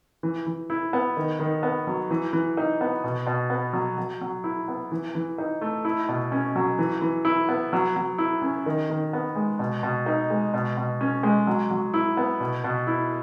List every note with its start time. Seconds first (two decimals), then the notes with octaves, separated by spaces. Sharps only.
0.23 E3
0.47 E3
0.70 E4
0.93 B3
1.17 D#3
1.39 D#3
1.63 B3
1.87 F#3
2.11 E3
2.33 E3
2.57 D#4
2.81 B3
3.04 B2
3.27 B2
3.50 B3
3.73 F#3
3.98 F#3
4.21 F#3
4.44 E4
4.68 B3
4.92 E3
5.15 E3
5.38 D#4
5.61 A3
5.85 E4
6.09 B2
6.32 C#4
6.56 F#3
6.79 E3
7.02 E3
7.25 E4
7.49 B3
7.73 F#3
7.96 F#3
8.18 E4
8.42 C#4
8.66 D#3
8.90 D#3
9.13 B3
9.36 G#3
9.59 B2
9.83 B2
10.06 D#4
10.30 G#3
10.54 B2
10.77 B2
11.01 C#4
11.23 G#3
11.47 F#3
11.71 F#3
11.94 E4
12.17 B3
12.40 B2
12.64 B2
12.87 E4